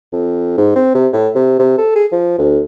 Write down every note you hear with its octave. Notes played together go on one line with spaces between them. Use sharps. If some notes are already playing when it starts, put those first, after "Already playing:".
F2
G#2
C4
C3
A2
C3
C3
A4
G#4
F3
D2